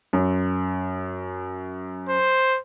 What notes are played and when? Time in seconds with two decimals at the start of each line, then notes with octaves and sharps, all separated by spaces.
0.13 F#2
2.09 C5